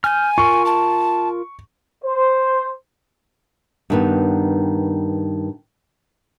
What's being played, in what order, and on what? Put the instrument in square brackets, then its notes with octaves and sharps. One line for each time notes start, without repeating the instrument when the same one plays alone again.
[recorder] G#5 [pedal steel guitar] F6 G6
[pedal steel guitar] F4 A#4 [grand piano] C#6
[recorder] A5
[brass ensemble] C5
[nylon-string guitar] G2 D#3 B3